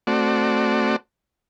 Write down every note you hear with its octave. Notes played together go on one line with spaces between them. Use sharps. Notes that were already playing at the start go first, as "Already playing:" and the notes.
A3 C4 F#4 D5